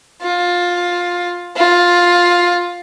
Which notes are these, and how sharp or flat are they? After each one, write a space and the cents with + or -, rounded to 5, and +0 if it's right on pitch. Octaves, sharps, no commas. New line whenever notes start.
F4 +15
F4 +10